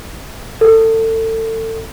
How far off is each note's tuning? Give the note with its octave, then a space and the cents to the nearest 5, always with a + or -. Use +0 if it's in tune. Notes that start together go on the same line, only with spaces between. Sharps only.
A4 +30